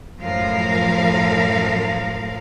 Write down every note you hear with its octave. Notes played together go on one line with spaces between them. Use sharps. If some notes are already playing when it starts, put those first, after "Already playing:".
F#2 A2 F3 A#4 F5